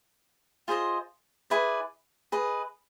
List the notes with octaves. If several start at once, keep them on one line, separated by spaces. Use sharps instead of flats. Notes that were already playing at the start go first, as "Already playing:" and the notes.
F4 G#4 C5 D#5
E4 G#4 B4 D5
G#4 B4 D#5